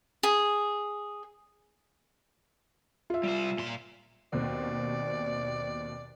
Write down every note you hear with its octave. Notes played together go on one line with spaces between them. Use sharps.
G#4
F4 E5
G3 C5
A#2 C6
D#2 B2 C4 D5